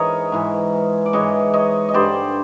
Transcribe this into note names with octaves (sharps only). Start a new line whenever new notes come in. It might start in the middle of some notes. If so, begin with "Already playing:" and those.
Already playing: G#2 E3 G#3 A#4 C#5 D#5
G#2 E3 G#3
D5
G#2 E3 G#3 C#5 D#5
C#5 D#5
D#5
G2 D3 G3 C5 D5